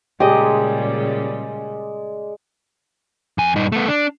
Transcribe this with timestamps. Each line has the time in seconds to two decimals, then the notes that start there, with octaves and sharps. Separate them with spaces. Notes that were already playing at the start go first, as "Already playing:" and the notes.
0.20 A#2 C#3 G3 G#3 G4 D5 D#5 A#5
3.38 F2 G#5
3.56 G2 D#4
3.72 A3 B3
3.88 D4